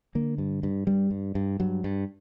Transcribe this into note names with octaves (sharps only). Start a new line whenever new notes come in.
D3 A#3
G2
G2
G2 G3
G2
G2
G2 F#3
G2